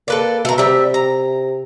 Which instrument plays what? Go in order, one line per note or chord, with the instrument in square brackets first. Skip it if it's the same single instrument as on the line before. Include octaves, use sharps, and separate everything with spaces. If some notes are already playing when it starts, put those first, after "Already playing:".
[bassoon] A#3 [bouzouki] A4 B4 D5
[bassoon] B2 [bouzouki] A3 A#5
[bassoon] C3 [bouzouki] G3 E5
[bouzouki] A#5